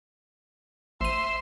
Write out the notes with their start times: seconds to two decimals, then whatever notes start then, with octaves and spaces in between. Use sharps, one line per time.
1.01 A1 C5 E5 C6 D#7